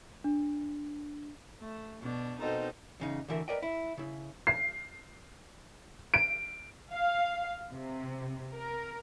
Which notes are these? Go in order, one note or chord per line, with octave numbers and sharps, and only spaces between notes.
D4
A3
B2 D4
B2 C4 D#4 A4 A#4 C5
E2 C#3 D#4
D2 D3 E3 A#4 E5
A#4 B4 D5 D#5 G5
E4
C#3 E4
C7
D7
F5
C3
A#4